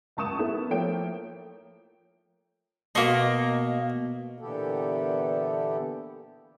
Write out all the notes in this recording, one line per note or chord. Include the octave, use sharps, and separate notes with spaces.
F#1 C#2 A5 C#6 D#6 E7
A#3 B3 E4 A4
F3 A3 A#3 C#5 G5 D7
B2 A#3 D#5 C6 C#6
A#2 D3 E3 B3 G4 A4